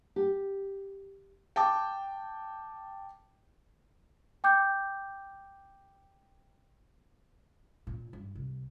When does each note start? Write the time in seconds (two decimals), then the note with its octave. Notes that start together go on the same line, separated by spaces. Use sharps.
0.16 G4
1.56 G5 A5 D6
4.44 G5 D6 G6
7.87 A#2
8.13 G2
8.35 C2